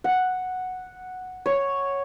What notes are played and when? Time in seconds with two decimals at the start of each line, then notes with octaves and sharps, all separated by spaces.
0.04 F#5
1.46 C#5